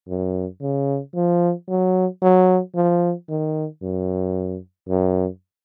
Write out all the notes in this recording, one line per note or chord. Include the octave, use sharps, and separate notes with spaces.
F#2
C#3
F3
F#3
F#3
F3
D#3
F#2
F#2